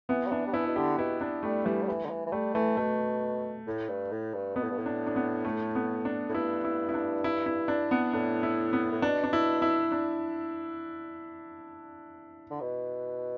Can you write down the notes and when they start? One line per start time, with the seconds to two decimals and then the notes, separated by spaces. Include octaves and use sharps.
0.09 E3 B3
0.26 G3
0.31 E3 D4
0.47 G3
0.54 E3 E4
0.67 B2
0.76 D3 G4
0.98 B2 E4
1.21 D4
1.43 G3 A3
1.65 E3 G3
1.83 G3
1.88 E3
2.05 D3
2.10 E3
2.27 E3
2.32 G3 A3
2.54 E3 A3
2.77 B2 A3
3.67 A2
3.89 G2
4.11 A2
4.34 G2
4.56 B2 B3
4.63 A2
4.70 G2
4.78 A2
4.86 D4
5.07 D4
5.16 B3
5.45 A3
5.75 B3
6.05 D4
6.29 A2
6.34 G2 E4
6.64 E4
6.89 E4
6.94 D4
7.24 E4
7.46 E4
7.68 D4
7.91 B3
8.13 A2 D4
8.43 E4
8.73 B3
8.92 A2
9.02 B2 D4
9.24 D4
9.33 E4
9.62 E4
9.92 D4
12.51 D3
12.61 B2